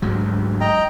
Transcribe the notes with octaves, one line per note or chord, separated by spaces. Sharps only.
D2 G#2 F#3
D#5 G5 A#5